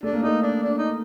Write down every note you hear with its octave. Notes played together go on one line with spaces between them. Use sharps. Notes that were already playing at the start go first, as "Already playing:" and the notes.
A3 D4
A#3
A3 D#4
D4
D4
D#4